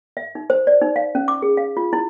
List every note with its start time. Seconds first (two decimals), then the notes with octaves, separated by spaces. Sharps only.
0.17 E5
0.35 D#4
0.50 C5
0.67 D5
0.81 D#4
0.96 F5
1.15 C#4
1.28 D6
1.42 G#4
1.57 F5
1.77 F4
1.93 E4